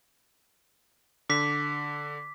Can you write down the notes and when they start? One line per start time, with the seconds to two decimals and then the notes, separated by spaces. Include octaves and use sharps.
1.29 D3 D6 B6